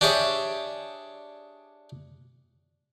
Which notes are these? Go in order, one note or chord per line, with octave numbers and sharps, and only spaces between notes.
D4 G4 G#4 C#5 E5